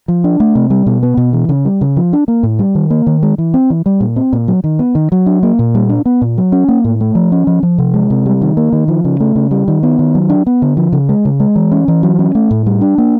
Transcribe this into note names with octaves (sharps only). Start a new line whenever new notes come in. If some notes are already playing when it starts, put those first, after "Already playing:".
F3
D4
A3
C3
G3
B2
B3
B2
E3
C#3
G3
C#3
F3
D4
A#3
A2
G3
D#3
A#3
D#3
G#3
E3
C4
E3
G3
A#2
C4
A#2
F#3
D#3
B3
D#3
F#3
D4
A#3
A#2
G3
D4
B3
A#2
F#3
C#4
A#3
A2
A3
F3
C#4
F3
F3
C3
G#3
C3
G3
D#3
A#3
D#3
F3
C#3
A3
C#3
G3
D#3
B3
D#3
F#3
D4
B3
D3
F3
C#3
G#3
C#3
G#3
E3
C#4
E3
F#3
C#4
A3
A2
G3
D4
A#3